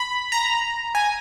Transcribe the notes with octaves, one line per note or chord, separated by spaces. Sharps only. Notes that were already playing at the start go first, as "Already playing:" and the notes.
Already playing: B5
A#5
G#5